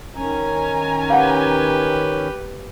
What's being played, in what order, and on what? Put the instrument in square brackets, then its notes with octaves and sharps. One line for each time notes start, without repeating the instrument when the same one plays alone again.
[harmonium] D#3 C#4 [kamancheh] G#5 A#5
[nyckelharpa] G4 B4 [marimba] F5 F#5